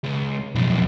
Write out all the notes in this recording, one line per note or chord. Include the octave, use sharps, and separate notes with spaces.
C#2
B1 F2